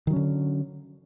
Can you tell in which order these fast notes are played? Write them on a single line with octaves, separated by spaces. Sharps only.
D#3 F#3 C#4 D3